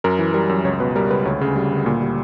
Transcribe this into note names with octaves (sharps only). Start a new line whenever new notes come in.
F#2 A#4
E3
G3 A#4
F#2
C#2 C#5
B2 B4
G3 A#4
C#2 B4
D2 C#5
C#3
G3
D2
A#2
G3